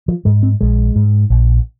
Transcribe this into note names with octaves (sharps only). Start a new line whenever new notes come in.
F3
G#2 G#3
C4
A#1 G#3
G#2
A#1